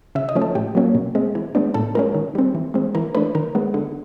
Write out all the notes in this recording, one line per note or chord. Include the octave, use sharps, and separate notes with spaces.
C#3 E5
D#5
F3 A3 C#4
A4
A2 G4
F#3 A#3 C#4
B2
G#3 C4
E3
G#3 B3 D4
A2 A4
F3 G#3 C#4 A#4
D#3
G3 C4
E3
G#3 C4
E3 A#4
A3 D4 B4
D#3 A#4
G#3 B3
D3